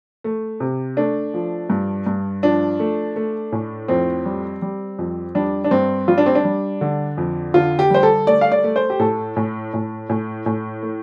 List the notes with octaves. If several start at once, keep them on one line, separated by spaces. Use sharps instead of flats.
A3
C3
A3 D4
F3
G2
G2
F3 D4
A3
A3
A2
F2 C4
G3
G3
F2
G3 D4
D4
G2 C4
G3 F4
D4
C4
D4
G3
D3
F2
D3 F4
G4
G3 C5
A4
A3 D5
F5
D5
A3
C5
G4
A2 A4
A2
A2
A2
A2
A3